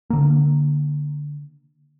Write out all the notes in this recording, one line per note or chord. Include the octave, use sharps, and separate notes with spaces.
D3 A#3